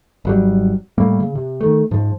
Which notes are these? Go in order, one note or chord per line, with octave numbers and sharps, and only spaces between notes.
G#1 F#3 G3
A2 G3 A3 A#3
C#3
C3
D#3 A3
G#2 F3